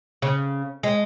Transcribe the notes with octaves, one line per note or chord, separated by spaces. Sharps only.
C#3
G#3